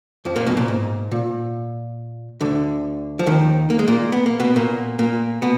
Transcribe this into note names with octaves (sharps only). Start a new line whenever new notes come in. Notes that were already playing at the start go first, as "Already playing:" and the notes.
F2 F3
A#2 A#3
B1 B2
A#2
G#2
A#2
D2 D3
F3
D#2 D#3
A#3
G#3
A#2 A#3
B3
A#3
B2 B3
A#2 A#3
A#2 A#3
B2 B3